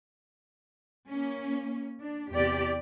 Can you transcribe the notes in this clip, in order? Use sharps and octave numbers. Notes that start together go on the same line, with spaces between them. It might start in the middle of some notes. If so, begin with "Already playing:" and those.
A#3 C#4
D4
E2 C3 G4 D5